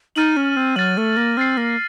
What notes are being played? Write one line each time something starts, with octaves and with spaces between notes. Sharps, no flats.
D#4 F6 A6 D#7 F#7
C#4
C4
F#3 F6 A6 D#7 F#7
A3
A#3
C4 F6 A6 C7
A#3